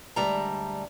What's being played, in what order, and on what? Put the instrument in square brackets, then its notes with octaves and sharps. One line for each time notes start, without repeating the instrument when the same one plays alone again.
[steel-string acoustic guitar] D2 G3 G#3 E5 A5 A#5